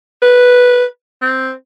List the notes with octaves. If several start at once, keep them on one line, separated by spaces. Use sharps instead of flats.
B4
C4